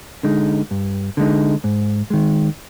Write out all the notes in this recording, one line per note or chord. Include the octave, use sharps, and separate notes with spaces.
D3 G#3 D#4
G2
D3 G#3 D#4
G#2
D#3 G#3